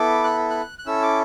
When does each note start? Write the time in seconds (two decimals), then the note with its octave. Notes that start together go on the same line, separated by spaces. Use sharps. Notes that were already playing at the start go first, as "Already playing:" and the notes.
Already playing: B3 E4 A4 D6
0.24 F#6
0.50 F#6
0.79 F#6
0.86 C#4 E4 A4 E6
1.02 D6